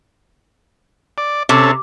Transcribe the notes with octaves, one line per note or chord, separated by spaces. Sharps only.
D5
C3 C#4 A4